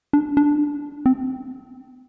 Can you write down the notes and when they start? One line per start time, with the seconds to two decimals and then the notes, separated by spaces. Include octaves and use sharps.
0.13 D4
0.37 D4
1.06 C4